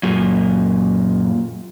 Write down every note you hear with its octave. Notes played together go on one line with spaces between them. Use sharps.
F#2 A#2